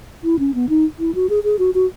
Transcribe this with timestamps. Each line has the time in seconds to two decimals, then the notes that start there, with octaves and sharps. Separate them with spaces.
0.24 E4
0.39 C#4
0.54 B3
0.69 D#4
0.99 E4
1.15 F#4
1.29 G#4
1.44 G#4
1.59 F#4
1.74 F#4